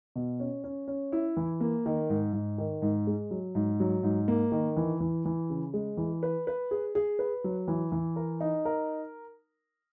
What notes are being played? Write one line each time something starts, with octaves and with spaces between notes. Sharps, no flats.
B2
C#4
C#4
C#4
E4
E3
A#3
D#3
G#2
G#2
D#3
G#2
G#3
F#3
G#2
F#3
G#2
A#3
D#3
E3
E3
E3
C#3
G#3
E3
B4
B4
G#4
G#4
B4
F#3
E3
E3
A#4
D#4
A#4